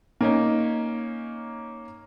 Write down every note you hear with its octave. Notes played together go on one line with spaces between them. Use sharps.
A#3 C#4 D#4